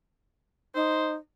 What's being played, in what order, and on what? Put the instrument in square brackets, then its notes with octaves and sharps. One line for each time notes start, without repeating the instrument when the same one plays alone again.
[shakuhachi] D#4 [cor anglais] C5